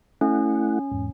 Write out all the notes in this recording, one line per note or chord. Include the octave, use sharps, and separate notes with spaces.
A3 C#4 E4 F#5
E2 G#2